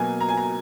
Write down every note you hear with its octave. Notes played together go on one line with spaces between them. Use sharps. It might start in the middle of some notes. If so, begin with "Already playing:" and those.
Already playing: B2 F#3 A#3 G#5
A#5
G#5
A#5